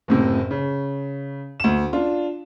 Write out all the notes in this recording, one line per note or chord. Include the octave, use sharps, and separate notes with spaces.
F#1 A2 C3
C#3
D2 E7
D4 F4